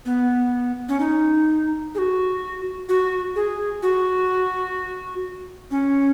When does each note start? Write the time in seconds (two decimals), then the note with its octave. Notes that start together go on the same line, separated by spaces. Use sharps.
0.06 B3
0.89 C#4
1.00 D#4
1.95 G#4
1.98 F#4
2.89 F#4
3.36 G#4
3.83 F#4
5.71 C#4